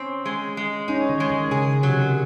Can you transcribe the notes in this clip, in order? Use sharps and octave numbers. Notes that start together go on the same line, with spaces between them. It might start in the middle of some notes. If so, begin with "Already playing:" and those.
Already playing: C4 C#4
G#3
G#3
C#4 D#4
D#3
G#3
D#3
C#3 G#4
C3 F#3